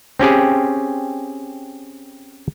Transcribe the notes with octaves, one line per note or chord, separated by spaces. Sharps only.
C4 C#4 G4 G#4